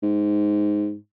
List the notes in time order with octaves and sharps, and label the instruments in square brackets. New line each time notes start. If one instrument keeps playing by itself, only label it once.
[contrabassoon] G#2